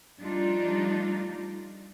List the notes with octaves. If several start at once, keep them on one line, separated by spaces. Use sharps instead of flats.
F3 G3 A3 D4 D#4 F4